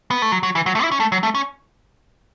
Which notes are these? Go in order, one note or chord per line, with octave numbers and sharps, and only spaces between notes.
B3
A3
F#3
F#3
E3
F#3
A3
E4
C#4
A3
F#3
A3
C#4